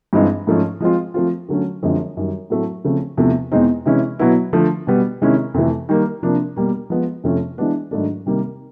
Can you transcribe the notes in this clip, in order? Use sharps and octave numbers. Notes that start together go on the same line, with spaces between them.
G2 E3 G#3 C4 D#4
G#2 F3 A3 C#4
F3 G#3 C4 F4
F3 A3 C4 F4
D3 F#3 A3 C#4
F#2 D3 F3 G#3 C4
F#2 D#3 G3
A2 F#3 A3 C4
C#3 F3 A3 C4
E2 C3 F3 A3
E2 B2 G#3 C4 D#4
C3 E3 G#3 C#4 E4
B2 F#3 B3 E4
D3 F3 A3
B2 G3 B3
C3 D#3 G#3 C#4 E4
F2 C3 E3 A3
D#3 G3 A#3
C3 F3 A#3 D4
B2 G3 A#3
F3 G#3 B3
F2 C3 F3 A3 C#4
E3 G#3 B3 D4
G#2 D#3 F#3 A3 D4
C3 D#3 G3 A#3